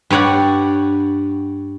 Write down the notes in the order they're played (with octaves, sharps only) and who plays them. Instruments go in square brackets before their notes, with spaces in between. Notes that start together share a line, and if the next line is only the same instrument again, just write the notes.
[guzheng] G2 G4 C#5 D5 F#5